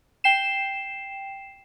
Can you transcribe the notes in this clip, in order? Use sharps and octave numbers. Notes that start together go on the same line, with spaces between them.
G5 C7 E7